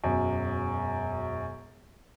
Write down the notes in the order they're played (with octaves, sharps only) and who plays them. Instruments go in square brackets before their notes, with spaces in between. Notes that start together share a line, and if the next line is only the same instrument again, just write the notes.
[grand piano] E1 F#2